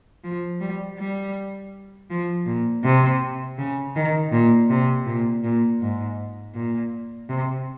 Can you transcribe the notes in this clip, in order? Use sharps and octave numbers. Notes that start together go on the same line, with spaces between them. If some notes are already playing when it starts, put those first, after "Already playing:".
F3
G3
G3
F3
A#2
C3
C#3
D#3
A#2
C3
A#2
A#2
G#2
A#2
C3